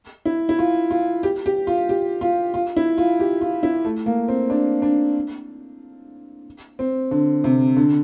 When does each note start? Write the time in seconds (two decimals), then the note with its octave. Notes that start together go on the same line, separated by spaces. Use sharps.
0.25 E4
0.49 E4
0.59 F4
0.91 F4
1.23 G4
1.46 G4
1.67 F4
1.89 G4
2.21 F4
2.54 F4
2.77 E4
2.98 F4
3.20 G4
3.41 F4
3.63 E4
3.85 A3
4.06 A#3
4.28 C4
4.50 D4
4.82 D4
6.79 C4
7.11 D3
7.44 C3
7.77 D3